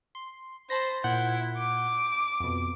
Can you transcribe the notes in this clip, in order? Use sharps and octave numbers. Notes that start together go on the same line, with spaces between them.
C6
C5 A5 B5 A#6
A#2 E4 F#5 G6
D6
F2 B2